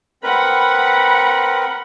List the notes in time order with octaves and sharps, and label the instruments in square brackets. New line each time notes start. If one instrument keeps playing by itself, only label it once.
[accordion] C4 A#4 B4 [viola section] F#5 B5